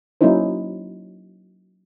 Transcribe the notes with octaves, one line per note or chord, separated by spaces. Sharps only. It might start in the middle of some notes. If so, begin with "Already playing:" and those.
F#3 A#3 C#4 D#4 E4 C5